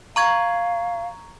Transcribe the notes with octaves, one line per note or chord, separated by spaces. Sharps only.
F5 A#5 C#6 G#6